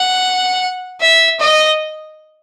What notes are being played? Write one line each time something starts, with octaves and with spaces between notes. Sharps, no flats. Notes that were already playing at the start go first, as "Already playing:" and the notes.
Already playing: F#5
E5
D#5